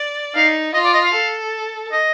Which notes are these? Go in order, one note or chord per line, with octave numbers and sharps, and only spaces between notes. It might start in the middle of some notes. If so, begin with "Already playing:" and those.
Already playing: D5
D#4 F5
F4 D#5
D5
D#5
F5
A4
D#5